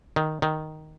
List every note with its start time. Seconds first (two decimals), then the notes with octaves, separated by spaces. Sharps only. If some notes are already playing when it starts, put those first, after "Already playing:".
0.16 D#3
0.42 D#3